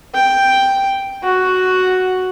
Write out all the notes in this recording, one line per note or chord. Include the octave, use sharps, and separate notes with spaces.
G5
F#4